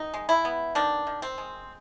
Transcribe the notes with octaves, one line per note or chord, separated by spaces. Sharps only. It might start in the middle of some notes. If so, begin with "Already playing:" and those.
Already playing: D#3 D#4
G#3
E4
B3
D#3 D4
D#3
C4
G#3